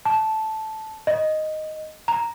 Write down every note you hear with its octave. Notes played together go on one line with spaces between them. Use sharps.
A5
D#5
A#5